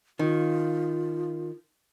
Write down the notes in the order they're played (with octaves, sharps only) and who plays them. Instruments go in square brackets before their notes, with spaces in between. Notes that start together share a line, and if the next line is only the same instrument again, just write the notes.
[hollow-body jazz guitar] D#3 [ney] F4